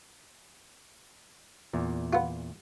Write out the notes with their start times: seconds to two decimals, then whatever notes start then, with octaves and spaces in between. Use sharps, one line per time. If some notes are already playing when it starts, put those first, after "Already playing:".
1.73 E2 A#2
2.13 B3 F4